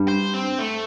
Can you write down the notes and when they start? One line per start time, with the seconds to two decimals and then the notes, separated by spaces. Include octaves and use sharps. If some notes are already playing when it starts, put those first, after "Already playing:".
Already playing: G2 G3 D4
0.08 C5
0.34 C4
0.59 A3